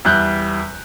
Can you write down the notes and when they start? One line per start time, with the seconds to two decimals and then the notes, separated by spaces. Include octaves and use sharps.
0.05 E2 G3 F#6 G6